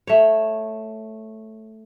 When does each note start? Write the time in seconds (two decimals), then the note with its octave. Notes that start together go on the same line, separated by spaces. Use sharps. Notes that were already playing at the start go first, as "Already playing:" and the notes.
0.07 A3 C#5